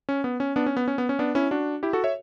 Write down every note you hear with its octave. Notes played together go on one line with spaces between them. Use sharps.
C#4
B3
C#4
B3 D4
C#4
B3
C#4
B3
C#4
B3 D4
C#4 E4
D4 F#4
E4 G4
F#4 A4
C#5 E5